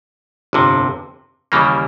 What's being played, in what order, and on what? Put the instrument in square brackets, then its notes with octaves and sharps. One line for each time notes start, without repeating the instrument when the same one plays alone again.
[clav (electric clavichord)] G1 F2 C3
D#2 C#3 E3 G3 A#3